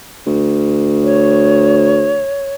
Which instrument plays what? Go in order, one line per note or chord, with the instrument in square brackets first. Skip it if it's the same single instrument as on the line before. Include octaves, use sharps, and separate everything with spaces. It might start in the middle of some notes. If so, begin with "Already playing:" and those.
[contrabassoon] D2
[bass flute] C#5